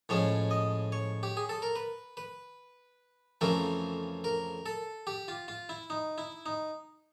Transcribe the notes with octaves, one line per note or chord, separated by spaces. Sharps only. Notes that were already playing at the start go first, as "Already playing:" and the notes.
A2 F3 G#3 C#4 C#5
D#5
C#5
G4
G#4
A4
A#4
B4
B4
F2 C#3 E3 A3 C4 A#4
A#4
A4
G4
F4
F4
E4
D#4
E4
D#4